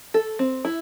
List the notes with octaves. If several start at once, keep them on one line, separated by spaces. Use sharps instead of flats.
A4
C4
E4